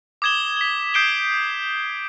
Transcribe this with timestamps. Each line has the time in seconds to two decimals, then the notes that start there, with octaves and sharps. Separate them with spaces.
0.22 D6 D#6 G#6 E7 G7
0.57 B6 G7
0.94 D#6 G6 C7 D7 E7 G7